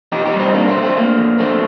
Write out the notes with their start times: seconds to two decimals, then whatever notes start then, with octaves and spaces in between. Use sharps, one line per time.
0.12 F2 D#4 G4
0.26 D#4 G4
0.33 G3
0.40 C4 D#4
0.54 D3 A#3 D4
0.68 A3 C4
0.76 D3
0.83 A3 C4
0.96 D3 A#3
1.18 F2
1.39 D3 A3 C4